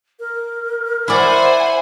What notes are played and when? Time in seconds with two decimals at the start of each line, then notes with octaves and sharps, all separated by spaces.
0.19 A#4
1.08 E4 C5 D5 F#5 G#5